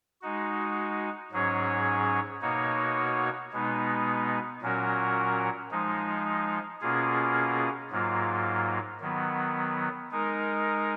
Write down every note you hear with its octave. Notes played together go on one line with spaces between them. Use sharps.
G#3 D#4 F#4
G#2 F#3 C#4 G#4 C#5
B2 A#3 D#4 F#4 C#5
B2 G#3 B3 D#4
A#2 F#3 C#4 F#4 A#4
F3 G#3 D#4
B2 A#3 C#4 F4 G#4
G#2 F#3 A#3 F4
D#3 F#3 B3
G#3 D#4 A#4